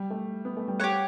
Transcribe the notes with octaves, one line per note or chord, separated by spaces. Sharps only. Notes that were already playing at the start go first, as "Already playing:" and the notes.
Already playing: G3
A3
B3
A3
G3
G4 C#5 F#5